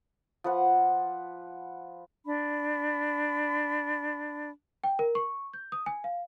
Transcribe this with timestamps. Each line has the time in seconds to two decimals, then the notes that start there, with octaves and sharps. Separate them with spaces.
0.44 F3 B4 F#5
2.26 D4 B5
4.84 G5
4.99 A#4
5.15 C#6
5.54 G6
5.72 D#6
5.86 G#5
6.04 F5